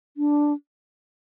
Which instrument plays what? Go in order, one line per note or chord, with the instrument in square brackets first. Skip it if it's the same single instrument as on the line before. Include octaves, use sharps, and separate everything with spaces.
[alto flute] D4